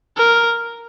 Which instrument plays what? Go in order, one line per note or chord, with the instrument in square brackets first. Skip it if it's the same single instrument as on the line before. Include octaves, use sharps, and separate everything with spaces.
[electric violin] A#4